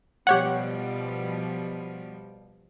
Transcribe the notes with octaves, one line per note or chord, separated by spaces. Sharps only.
B2 F3 G3 G4 C#5 F#5